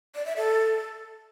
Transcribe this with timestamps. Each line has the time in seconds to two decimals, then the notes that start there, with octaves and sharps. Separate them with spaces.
0.15 D5
0.26 E5
0.37 A4